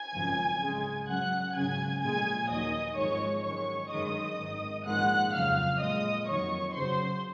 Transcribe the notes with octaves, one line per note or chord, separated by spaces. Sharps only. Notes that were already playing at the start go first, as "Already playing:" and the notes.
Already playing: G#5 G#6
G#1 F#2 C#3 F3
C#2 C#3 G#3
F#2 C#3 F#3 F#5 F#6
G#1 F#2 C#3 F#3 G#5 G#6
A#1 A#2 G#3 G#5 G#6
D#2 D#3 F#3 D#5 D#6
G#1 G#2 F3 G#3 C#5 C#6
F#2 D#3 G#3 C#5 C#6
F#2 D#3 G#3 D#5 D#6
G#1 G#2 D#3
A#1 G#2 D#3 G#3 F#5 F#6
F2 C#3 F#3 F5 F6
A#1 A#2 G#3 D#5 D#6
F2 D#3 F#3 C#5 C#6
F#2 C#3 F#3 C5 C6